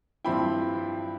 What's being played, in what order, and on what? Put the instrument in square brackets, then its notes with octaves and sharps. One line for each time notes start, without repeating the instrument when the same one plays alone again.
[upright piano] G2 F3 C4 E4 G5 B5